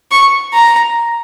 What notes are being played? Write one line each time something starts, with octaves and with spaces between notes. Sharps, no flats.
C#6
A#5